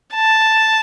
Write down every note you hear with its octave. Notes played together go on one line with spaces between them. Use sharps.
A5